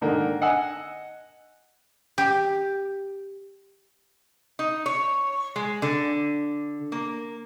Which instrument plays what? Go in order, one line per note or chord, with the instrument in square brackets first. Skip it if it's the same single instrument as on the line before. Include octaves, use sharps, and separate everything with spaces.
[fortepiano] G#2 D3 D#3 A#3
D#5 F#5 G#5 E6
[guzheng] G4
[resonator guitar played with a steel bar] D#4
C#5
G#3
D3
A#3